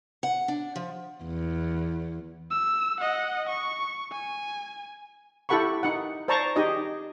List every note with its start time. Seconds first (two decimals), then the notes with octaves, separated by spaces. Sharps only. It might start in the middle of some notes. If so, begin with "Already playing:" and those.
0.23 F#5
0.48 D4
0.76 F3
1.24 E2
2.51 E6
3.00 D#5 F#5
3.49 C#6
4.12 G#5
5.49 E4 G4 A4 F#5 B5 C#6
5.83 D#4 F#5
6.28 C5 D5 A5 A#5 C#6
6.56 D#4 G4 G#4 D#5